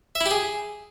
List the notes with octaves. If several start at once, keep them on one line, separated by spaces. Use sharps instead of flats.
E5
E4
G4
G#4